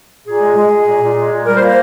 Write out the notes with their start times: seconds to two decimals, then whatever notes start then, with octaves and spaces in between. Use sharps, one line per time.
0.25 A#2 G#4
0.41 G#3
0.56 G#3
0.70 G#3
0.85 A#2
1.00 A#2
1.17 G#3
1.31 A#2
1.45 G3 A#4
1.56 C5
1.61 A#3
1.67 C5